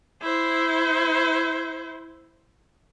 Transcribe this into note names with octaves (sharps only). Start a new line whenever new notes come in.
E4 C5